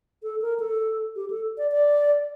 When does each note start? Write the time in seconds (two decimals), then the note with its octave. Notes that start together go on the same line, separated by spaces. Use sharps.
0.23 A4
0.42 A#4
0.60 A4
1.16 G4
1.30 A4
1.58 D5
1.72 D5